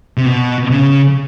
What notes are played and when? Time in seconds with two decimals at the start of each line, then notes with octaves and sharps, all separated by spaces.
0.17 C3
0.26 B2
0.70 C#3